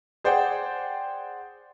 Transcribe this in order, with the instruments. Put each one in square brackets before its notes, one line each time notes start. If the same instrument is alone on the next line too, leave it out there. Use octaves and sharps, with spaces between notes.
[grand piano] G#4 C5 D5 F#5 G5